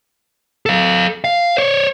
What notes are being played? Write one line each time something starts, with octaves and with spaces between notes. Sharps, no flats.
A4 F5
F5
C5 C#5